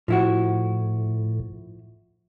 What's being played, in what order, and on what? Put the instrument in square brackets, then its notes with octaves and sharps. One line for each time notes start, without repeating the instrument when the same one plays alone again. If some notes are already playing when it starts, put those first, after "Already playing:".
[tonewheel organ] A2 [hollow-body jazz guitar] F3 E4 F#4